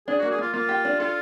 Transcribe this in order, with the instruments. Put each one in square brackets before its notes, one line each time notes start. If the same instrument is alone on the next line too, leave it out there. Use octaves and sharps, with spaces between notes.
[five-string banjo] D4 [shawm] G#4
[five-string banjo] A#3 [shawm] F#4
[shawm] G#4
[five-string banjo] A#3 [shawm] F4
[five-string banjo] A#3 [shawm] F4
[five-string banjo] G4
D4
[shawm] F4 [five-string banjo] A4